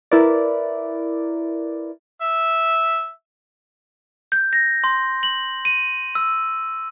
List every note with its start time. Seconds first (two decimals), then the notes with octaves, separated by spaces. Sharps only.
0.11 E4 A#4 B4 D5
2.21 E5
4.32 G6
4.53 A#6
4.84 C6
5.23 F#7
5.65 D#7
6.15 E6